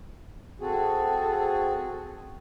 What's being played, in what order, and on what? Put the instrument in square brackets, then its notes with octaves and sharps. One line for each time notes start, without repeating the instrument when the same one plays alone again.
[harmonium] C4 F#4 G#4 [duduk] A4